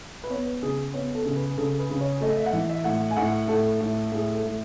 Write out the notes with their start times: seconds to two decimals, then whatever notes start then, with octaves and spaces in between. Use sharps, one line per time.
0.24 B4
0.30 B3 C#5
0.46 B4
0.62 C#3 G#4
0.94 B3 C#5
1.15 A4
1.25 C#3
1.36 B4
1.57 C#3 A4
1.79 B4
1.90 C#3
2.01 C#5
2.21 A3 D#5
2.37 E5
2.46 F#5
2.53 E3 E5
2.70 E5
2.84 A2 F#5
3.11 G#5
3.17 A2 F#5
3.48 A2 A4
3.81 A2
4.12 A2 G#4
4.34 A4
4.43 A2